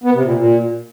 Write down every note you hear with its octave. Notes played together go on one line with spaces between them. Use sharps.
B3
C3
A#2
A#2